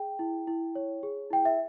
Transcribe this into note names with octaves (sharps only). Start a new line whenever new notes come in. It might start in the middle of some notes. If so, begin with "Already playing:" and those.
Already playing: G#4 G5
E4
E4
C#5
G#4
E4 G5
E5